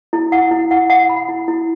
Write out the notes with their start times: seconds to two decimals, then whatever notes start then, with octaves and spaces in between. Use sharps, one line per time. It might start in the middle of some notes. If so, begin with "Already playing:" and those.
0.13 E4
0.32 F#5
0.51 E4
0.71 F#5
0.90 F#5
1.09 B5
1.29 E4
1.48 E4